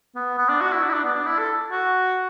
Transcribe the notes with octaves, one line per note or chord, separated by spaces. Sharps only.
B3
B3
D4
F#4
E4
D4
E4
D4
B3
D4
E4
A4
F#4